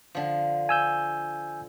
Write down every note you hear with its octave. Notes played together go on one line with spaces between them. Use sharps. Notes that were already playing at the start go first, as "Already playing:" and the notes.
D3 F3
G#5 E6 G6